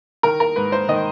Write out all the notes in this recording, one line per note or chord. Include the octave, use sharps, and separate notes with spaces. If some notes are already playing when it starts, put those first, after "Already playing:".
D#3 A#4
A#4
G#2 B4
C5
D#3 D#5